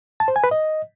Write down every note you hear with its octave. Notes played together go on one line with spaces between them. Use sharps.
A5
C5
G#5
B4
D#5